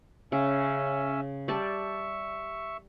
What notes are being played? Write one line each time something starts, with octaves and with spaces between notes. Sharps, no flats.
C#3 C#4 E5
G3 D5 E5 A5 C#6